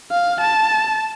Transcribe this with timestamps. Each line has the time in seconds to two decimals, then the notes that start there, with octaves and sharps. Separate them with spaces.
0.11 F5
0.41 A5